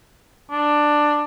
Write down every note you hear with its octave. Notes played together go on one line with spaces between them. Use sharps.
D4